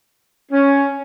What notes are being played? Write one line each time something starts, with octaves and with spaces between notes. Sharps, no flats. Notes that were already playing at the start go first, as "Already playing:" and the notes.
C#4